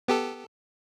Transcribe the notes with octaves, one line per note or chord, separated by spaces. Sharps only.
B3 G4 A4